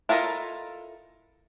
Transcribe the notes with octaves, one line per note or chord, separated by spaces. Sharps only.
E4 F4 A4 A#4 D#5